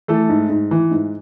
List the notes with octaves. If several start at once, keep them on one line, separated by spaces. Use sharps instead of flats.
E3 A3 A4
G#2
G#2
E3
G#2